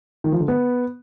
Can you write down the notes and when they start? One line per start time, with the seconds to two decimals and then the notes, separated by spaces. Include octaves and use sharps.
0.24 D#3
0.32 F3
0.40 D3
0.48 B3